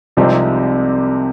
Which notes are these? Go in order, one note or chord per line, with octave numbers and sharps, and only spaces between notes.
C2 C3 F3 G#3 C4 D#4 G4